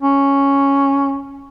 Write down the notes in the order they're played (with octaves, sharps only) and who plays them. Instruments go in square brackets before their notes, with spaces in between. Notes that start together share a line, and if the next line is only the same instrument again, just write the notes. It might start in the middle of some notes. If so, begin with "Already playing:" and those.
[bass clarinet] C#4